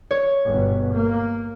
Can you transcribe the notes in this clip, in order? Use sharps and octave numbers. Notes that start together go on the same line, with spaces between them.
C#5
G1 B2
A#3